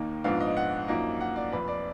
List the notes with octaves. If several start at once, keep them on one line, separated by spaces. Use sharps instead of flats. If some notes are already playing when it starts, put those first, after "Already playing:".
Already playing: D#2 D#3 A#3 D#4
A#1 G#2 F3 B3 D4 F5
D#5
F#5
F#2 F3 A#3 D#4
F#5
D5
F1 F2 F3 B4
D5